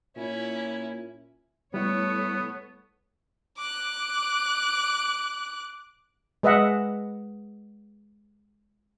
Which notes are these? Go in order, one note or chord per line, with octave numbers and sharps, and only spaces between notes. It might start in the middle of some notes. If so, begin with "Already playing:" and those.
A#2 C#4 E4
G3 A3 B3 E4 A4 C#5
D6 F#6
G#3 B4 D#5 E5 F#5